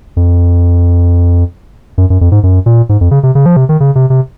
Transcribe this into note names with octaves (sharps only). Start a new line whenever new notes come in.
F2
F#2
F#2
F2
G#2
F#2
A#2
G#2
F2
C#3
C3
C#3
F3
C3
D#3
C#3
C3
C3